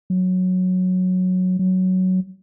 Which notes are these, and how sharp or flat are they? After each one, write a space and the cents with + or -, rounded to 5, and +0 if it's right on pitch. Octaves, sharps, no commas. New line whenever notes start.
F#3 -10
F#3 +5